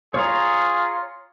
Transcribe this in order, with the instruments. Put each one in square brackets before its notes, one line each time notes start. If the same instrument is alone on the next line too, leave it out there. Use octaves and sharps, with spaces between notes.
[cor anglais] F4 [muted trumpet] G#4 [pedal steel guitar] C#5 A#5